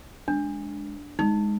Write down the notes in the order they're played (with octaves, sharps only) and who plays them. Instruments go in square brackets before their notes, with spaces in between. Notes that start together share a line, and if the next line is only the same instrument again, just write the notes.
[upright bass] G#3 [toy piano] D4
[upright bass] G#3 [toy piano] D#4